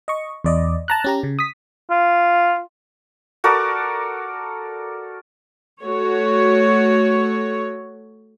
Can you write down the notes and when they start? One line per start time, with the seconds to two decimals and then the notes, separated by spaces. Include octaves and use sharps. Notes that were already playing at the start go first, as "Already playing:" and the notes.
0.08 D#5 C#6
0.44 E2 D5 D#5
0.88 A5 A#5 F#6
1.04 C#4 G4 A#5
1.23 C#3
1.39 D#6 B6
1.90 F4
3.44 F#4 A4 A#4 D5
5.82 A3 F#4 C#5